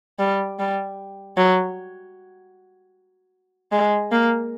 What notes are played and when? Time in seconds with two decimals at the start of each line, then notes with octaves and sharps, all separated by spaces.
0.19 G3
0.59 G3
1.37 F#3
3.72 G#3
4.12 A#3